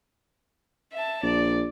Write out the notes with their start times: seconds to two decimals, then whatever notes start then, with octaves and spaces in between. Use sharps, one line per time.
0.93 E5 A5
1.23 A#1 D5